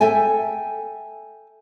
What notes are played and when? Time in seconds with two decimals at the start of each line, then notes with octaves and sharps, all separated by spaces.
0.01 A4 E5 G5 G#5